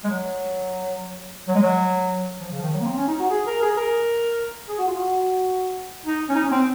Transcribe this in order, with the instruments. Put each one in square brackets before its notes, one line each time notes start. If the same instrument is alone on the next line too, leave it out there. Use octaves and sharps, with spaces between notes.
[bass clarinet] G#3
F#3
F#3
G#3
F#3
F3
C#3
F3
D#3
F#3
A#3
C4
C#4
D#4
F#4
G#4
A#4
G#4
A#4
G#4
F#4
F4
F#4
D#4
C#4
D#4
C#4
C4